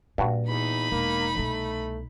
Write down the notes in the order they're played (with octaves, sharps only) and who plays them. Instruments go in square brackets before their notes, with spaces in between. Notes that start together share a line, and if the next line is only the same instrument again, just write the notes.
[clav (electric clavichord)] G2 F#4 [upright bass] A#2
[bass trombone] E2 [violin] D#4 B5
[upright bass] E1 [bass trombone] A#3
[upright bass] C2 B2 [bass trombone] A3